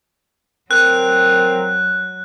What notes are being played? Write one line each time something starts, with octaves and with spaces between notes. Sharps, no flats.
F#3 C4 A#4 F#6